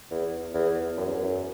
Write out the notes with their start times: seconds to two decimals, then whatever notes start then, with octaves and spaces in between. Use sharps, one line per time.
0.11 E2
0.54 E2
0.97 F#2
1.06 E2
1.15 F#2